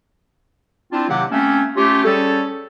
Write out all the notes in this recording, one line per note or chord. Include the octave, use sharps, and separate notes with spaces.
C4 D4 E4 F4
C3 D#3 F#3 A#3 G4 F#5
A3 A#3 C4 C#4
A3 C#4 F4 G4
G3 C#4 G#4 A4